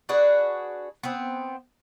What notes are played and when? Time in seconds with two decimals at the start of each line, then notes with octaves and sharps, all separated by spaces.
0.09 D4 F#4 G#4 B4
1.03 B3 C4